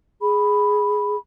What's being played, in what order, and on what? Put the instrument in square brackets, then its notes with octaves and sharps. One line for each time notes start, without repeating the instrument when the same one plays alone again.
[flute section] G#4 B5